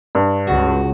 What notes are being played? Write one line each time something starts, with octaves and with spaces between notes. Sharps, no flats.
G2
C#2 F#4